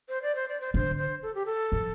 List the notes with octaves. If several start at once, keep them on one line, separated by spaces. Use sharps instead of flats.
C5
D5
C5
D5
C5
D3 C5
C5
A4
G4
A4
F3